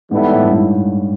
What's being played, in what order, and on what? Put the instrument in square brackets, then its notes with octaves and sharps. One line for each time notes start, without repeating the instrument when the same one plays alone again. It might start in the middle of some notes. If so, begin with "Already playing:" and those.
[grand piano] G#2 [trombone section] E3 G3 B3 E4 A4
[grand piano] A2
G2
G#2